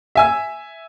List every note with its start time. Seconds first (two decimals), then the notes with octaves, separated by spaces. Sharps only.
0.15 E5 G#5 E6